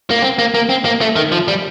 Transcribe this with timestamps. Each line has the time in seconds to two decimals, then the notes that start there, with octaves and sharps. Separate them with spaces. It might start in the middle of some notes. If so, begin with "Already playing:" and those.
0.11 A#3
0.22 C4
0.39 A#3
0.54 A#3
0.69 C4
0.85 A#3
1.01 A3
1.16 D#3
1.32 F3
1.48 G3